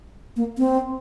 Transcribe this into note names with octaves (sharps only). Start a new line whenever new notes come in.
A#3
C4